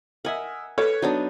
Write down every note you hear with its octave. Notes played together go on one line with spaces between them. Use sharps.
A#4 D#5 E5 F#5 G#5
A4 B4 C#5 D6
F#3 B3 D4 D#4